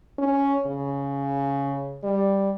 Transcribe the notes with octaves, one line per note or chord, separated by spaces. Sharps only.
C#4
C#3
G3